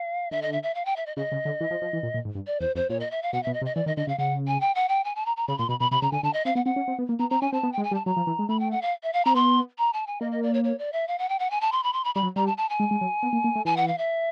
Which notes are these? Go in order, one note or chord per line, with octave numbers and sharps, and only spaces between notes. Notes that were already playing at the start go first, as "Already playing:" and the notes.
Already playing: F5
D3 E5
D#5
E5
E5
F5
G5
E5
D#5
C#3 D#5
C#3
D3
E3
F3
F3
E3
A#2
A#2
G#2
G2
D5
E2 C5
F2 C5
A#2 C#5
D#5
E5
F5
B2 F#5
B2 E5
D#5
C3
D#5
E3 D5
D#3 D#5
D3 D#5
C#3 F5
C#3 F#5
G#5
G5
F#5
G5
G#5
A5
A#5
A#5
C#3 B5
A#2 C6
B2 B5
B2 B5
C3 B5
C#3 A#5
D3 G#5
D3 A5
D#5
C4 F5
B3 F#5
C4 F#5
C#4
C4
B3
A#3
B3 A#5
C4 A#5
C#4 G#5
C4 A5
B3
G5
G#3
G#5
G3
A5
F#3 A#5
F3
E3
G#3
A3 B5
G5
F#5
F5
E5
F5
C4 A#5
B3 C6
A#5
A5
G#5
A#3 D#5
D#5
D5
C#5
C#5
D5
E5
F5
F#5
G5
F#5
G#5
A5
C6
B5
C6
B5
G3 B5
F#3
G3 A#5
A5
A5
G#5
G#3
G#3
F#3
B3
A#3
A#3
A3
E3 G#5
F#5
F5
E5